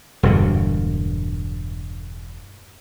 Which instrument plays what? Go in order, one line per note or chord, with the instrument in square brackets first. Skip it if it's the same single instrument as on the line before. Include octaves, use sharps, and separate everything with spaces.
[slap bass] E1 G2 D3